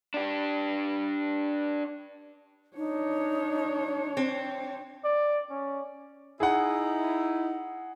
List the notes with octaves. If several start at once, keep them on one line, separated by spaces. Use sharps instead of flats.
D4 G4
D4 D#4 C#5
C4
D5
C#4
D#4 E4 G#4 F#5